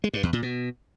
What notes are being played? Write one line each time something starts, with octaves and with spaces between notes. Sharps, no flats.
G#3
G2
E2
A#2
B2